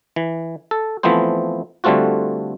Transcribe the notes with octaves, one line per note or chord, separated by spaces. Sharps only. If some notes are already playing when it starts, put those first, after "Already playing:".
E3
A4
E3 F3 A3 B3 C4 C5
D3 G3 A3 C4 F4 F#4